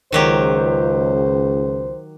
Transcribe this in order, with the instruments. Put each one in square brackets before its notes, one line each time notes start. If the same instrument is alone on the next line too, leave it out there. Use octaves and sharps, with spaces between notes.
[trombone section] C#2 [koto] D#3 F#3 G4 [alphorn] C5